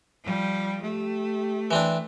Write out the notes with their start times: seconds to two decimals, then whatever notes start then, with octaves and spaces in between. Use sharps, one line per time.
0.24 F3 G3
0.82 A3 G4
1.71 E3 C4 D4